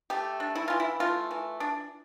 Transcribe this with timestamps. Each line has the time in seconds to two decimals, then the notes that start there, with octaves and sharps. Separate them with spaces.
0.10 A3 G4
0.40 D4
0.56 E4
0.68 E3 F4
0.80 E4
1.00 A3 F4
1.31 E3
1.60 D4